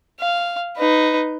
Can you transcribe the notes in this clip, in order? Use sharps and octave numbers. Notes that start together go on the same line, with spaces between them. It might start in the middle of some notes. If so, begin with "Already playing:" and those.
F5
D#4 B4